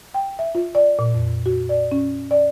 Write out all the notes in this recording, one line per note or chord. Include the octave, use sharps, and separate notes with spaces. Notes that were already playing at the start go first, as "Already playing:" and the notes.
G5
E5
F4
D5
A#2
F2
F#4
D5
C#4
D5